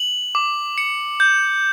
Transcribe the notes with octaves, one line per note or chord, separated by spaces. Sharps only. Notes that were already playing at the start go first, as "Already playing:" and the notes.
Already playing: F#7
D6
C#7
G6